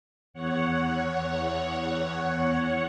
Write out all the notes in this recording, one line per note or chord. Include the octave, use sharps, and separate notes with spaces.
E2 C#5 F#5